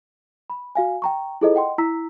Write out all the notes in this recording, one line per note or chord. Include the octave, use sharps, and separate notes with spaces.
B5
F#4 F5 G#5
G5 A#5 C#6
E4 F4 G#4 A4 C5 D#5
D#5 F#5 G5 C6
E4 A#5 E6 B6